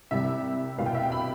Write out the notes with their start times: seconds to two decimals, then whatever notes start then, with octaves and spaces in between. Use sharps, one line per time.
0.11 C2 C3 G3 E5
0.78 C2 B2 G3 F5
0.86 G5
0.95 E5
1.03 G5
1.12 B5